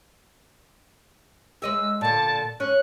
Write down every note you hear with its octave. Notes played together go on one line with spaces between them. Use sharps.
G#3 D#5 E5 E6
A#2 D3 A5
C#4 F#6